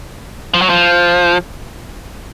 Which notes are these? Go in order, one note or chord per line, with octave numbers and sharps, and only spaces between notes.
F3
F#3
F3